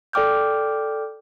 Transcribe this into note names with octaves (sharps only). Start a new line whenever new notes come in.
A4 D5 G5 D6 F6 G6